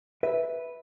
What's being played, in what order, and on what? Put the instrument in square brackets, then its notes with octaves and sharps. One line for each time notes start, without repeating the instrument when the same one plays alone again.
[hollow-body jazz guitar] B4 E5